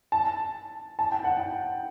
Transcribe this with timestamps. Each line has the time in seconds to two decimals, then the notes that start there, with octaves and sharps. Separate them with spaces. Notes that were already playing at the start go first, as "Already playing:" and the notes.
0.12 A5
0.99 A5
1.12 G5
1.24 F#5
1.37 G5